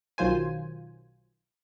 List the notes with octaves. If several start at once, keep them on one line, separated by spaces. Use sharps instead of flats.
B1 D#3 F#3 F4 C5 G#5